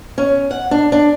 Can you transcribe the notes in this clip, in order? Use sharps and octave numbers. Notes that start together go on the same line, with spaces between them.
C#4
F#5
D4
D4